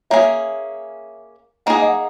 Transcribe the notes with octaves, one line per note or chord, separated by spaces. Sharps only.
A#3 C#4 G#4 C#5 E5
A#3 D#4 G#4 F#5
G#5
D#5 F#5